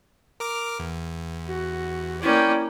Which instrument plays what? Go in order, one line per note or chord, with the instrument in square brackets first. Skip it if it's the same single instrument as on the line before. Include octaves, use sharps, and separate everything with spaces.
[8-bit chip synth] A#4 D6 F6
E2
[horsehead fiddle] F#4
[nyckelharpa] A#3 C#4 [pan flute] E4 [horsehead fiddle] D5 G5